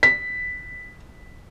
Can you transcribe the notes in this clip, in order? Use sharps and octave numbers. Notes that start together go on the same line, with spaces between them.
B6